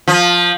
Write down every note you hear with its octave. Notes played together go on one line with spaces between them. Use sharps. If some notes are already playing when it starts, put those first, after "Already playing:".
F3